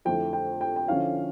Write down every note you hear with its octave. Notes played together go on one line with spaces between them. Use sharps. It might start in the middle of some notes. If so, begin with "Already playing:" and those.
F2 D3 A3 E4 G5
G5
G5
G5
D3 F3 C#4 E4 F5